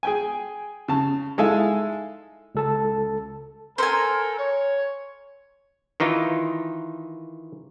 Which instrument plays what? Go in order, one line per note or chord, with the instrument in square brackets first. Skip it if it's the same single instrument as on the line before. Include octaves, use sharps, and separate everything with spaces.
[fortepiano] G#4 G5 G#5
C#3 A5
G#3 D#4 E4 A4 F5 G#5
[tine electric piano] C#2 A4 A5
[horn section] A4 A#4 [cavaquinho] C5 G#5
[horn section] C#5
[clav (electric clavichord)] D#3 E3 D#4 F4